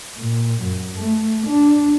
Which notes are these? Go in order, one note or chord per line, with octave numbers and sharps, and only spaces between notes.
A#2
F#2
A3
D4